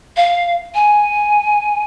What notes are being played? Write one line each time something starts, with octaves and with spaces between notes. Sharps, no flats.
F5
G#5